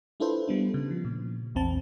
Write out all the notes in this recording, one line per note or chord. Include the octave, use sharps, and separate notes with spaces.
D4 E4 F4 A4 B4 C5
G3 B3 D4
C#3
F3
A#2
A#1 E2 C4 A5